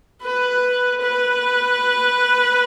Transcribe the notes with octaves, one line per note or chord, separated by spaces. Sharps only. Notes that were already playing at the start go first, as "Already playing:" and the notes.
B4
B4